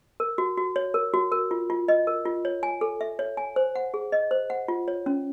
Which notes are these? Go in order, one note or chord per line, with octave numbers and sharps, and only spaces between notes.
A#4
F#4
F#4
C#5
A#4
F#4
A#4
F4
F4
D#5
A#4
F4
C#5
G#5
A4
E5
C#5
G#5
C5
F#5
G#4
D#5
C5
F#5
F4
C#5
C#4